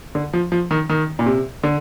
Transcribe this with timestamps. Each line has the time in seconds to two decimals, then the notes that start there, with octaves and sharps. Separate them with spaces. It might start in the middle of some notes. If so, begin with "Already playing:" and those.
0.15 D3
0.33 F3
0.52 F3
0.71 D#3
0.90 D#3
1.19 A#2
1.26 C3
1.63 D3